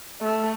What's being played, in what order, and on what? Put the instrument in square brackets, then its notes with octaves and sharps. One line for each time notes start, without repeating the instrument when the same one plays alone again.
[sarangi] A3